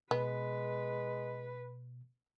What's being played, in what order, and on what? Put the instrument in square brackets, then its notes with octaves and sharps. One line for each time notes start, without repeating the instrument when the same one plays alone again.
[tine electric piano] B2 [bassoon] G#3 [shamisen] B3 [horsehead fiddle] B4